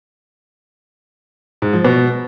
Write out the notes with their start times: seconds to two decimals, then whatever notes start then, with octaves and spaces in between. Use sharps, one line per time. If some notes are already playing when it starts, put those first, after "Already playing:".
1.62 G#2
1.73 F3
1.85 B2